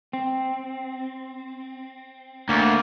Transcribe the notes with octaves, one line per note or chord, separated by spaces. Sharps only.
C4
D2 A#3